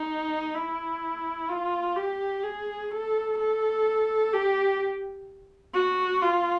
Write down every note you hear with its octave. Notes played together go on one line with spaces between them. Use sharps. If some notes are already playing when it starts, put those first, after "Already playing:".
Already playing: D#4
E4
F4
G4
G#4
A4
A4
G4
F#4
F4